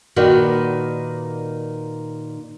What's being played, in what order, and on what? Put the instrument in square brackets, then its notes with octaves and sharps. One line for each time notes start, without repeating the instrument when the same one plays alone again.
[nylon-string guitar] A#2 D#3 D#4 F#4 B4 D5